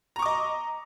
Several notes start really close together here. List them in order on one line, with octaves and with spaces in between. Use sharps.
A#5 C#6 D6 D#5